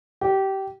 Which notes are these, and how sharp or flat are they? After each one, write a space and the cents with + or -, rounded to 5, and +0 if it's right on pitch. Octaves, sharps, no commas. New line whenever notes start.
G4 -20